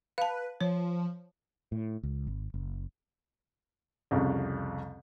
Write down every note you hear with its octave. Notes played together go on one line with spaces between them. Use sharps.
B4 F5 A5
F3 C#5
A2
C#2
G#1
F#1
C2 F2 C#3